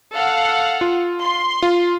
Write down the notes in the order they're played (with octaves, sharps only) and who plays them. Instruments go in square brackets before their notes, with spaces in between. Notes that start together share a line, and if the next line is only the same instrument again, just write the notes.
[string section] A4 F5 F#5
[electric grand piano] F4
[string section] C6
[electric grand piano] F4